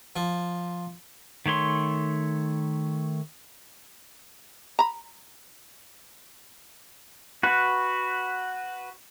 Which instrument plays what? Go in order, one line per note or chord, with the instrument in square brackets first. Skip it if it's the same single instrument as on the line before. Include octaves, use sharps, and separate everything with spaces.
[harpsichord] F3
[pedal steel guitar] D#3 A3 C#5 C6
[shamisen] A#5 B5
[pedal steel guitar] F#4 B4